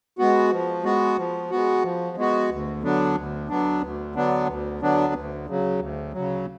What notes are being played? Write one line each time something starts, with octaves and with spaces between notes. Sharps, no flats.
G#3 B3 F#4
F3
G#3 B3 F#4
F3
G#3 B3 F#4
F3
G#3 B3 F#4
D2
D3 F#3 B3 D4
D2
D3 F#3 B3 D4
D2
D3 F#3 B3 D4
D2
D3 F#3 B3 D4
D2
C#3 F#3
D2
C#3 F#3